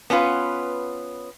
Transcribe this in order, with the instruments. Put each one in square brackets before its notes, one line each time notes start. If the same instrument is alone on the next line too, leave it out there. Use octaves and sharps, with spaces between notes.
[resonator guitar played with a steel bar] B3 C#4 D4 F4 B4